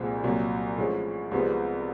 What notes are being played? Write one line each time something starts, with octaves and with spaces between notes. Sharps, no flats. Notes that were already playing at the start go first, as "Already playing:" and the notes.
Already playing: C2 A#2 F3 G#3 C4
C2 A#2 F#3
A2 F3 G#3 C#4
C2 C3 F3 G#3 B3